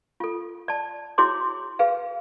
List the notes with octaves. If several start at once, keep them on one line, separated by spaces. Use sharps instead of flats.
F4 A4
D5 A5
E4 F#4 G#4 C#5 C6 D6
G#4 B4 F5